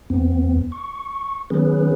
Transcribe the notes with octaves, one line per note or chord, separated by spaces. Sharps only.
E2 B3 C4
C#6
D#3 F#3 B3 C#4 G#4 B4